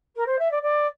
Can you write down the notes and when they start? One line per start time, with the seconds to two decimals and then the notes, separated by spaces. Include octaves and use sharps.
0.16 A#4
0.26 C5
0.38 E5
0.51 D5
0.62 D5